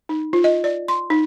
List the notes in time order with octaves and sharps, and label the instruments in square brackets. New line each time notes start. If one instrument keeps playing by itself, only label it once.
[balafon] D#4
F4
D#5
D5
C6
D#4